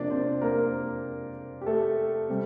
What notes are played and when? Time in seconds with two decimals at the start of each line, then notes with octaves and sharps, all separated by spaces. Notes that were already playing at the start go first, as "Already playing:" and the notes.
Already playing: C3 F3 A#3 D4 D5
0.11 C4 C5
0.41 A#3 A#4
1.61 G4
1.66 A3 A4
2.29 C3 G3